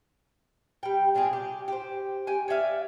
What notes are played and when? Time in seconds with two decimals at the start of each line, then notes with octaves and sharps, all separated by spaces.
0.83 G3 G5
1.15 C3 D4 F4 G#4
1.33 G4
1.68 G4 C5
2.27 G4 G5 G#5
2.48 C#5 D5 E5 F5